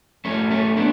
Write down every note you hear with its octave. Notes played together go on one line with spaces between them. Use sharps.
A3 C#4
A3 C#4
B3 D4